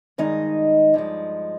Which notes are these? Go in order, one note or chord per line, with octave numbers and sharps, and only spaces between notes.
G2 D#3 G#3 D#4 D#5
G2 F3 G#3